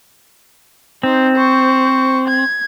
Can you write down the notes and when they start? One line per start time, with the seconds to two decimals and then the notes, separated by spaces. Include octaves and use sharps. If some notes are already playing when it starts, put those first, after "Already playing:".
1.03 C4 D#4 C5
1.36 C5 C#6
2.28 G#6